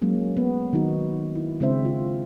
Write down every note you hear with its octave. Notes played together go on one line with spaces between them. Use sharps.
F#3 G#3 A#3 C#4
G#3 B3
D#3 F#3 D#4 F#4
E4
C#3 G#3 C4 D4 C5 E5
F4